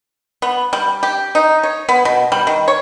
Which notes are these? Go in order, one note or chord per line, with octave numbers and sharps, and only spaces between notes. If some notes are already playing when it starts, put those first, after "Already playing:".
B3
G3
G4
D#4
C#5
B3
B2
G3
D#3
C#5